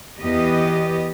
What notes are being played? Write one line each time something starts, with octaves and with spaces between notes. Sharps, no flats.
E2 B3 G4 D#5